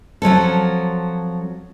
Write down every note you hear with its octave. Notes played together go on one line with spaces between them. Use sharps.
F3 F#3 C4 A4